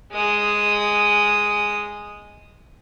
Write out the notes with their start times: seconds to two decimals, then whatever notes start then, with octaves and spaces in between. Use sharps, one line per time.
0.12 G#3 D#6